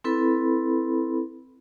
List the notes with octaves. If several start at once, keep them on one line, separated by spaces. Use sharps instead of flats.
C4 E4 A4 B4 B5